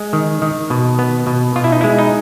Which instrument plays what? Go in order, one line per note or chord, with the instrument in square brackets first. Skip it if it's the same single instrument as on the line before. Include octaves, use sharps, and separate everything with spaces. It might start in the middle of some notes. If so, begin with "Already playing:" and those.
Already playing: [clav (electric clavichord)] G#3
D#3
D#3
B2
B3
B2
B2 F4
E4
D#4
G#3 E4
D#4